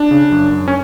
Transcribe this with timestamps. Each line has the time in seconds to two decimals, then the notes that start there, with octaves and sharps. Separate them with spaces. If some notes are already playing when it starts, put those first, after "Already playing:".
Already playing: D4
0.11 C#3
0.31 F#2
0.52 F#2
0.68 C#4